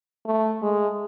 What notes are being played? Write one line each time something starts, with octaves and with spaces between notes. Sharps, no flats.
A3
G#3